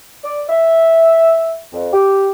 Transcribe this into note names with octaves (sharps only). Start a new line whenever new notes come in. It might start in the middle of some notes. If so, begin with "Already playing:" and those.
D5
E5
F2
G4